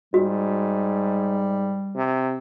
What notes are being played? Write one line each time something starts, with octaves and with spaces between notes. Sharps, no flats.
G#2 G3 F#4
C3